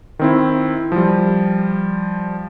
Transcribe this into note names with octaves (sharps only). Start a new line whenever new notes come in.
D#3 C4 E4
F3 G3